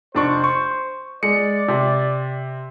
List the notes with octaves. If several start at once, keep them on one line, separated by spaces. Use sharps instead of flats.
F1 D4 C5 C#6
C#6
G#3 D5 C#7
C3